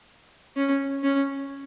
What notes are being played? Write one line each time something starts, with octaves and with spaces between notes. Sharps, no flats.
C#4
C#4